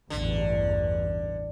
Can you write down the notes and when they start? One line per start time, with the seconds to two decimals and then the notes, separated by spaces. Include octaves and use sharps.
0.10 A1 E2 G2 D3